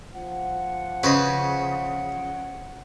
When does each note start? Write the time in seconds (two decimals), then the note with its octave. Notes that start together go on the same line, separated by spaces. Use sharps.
0.14 F3 F#5
1.03 C#3 B4 C5 D#5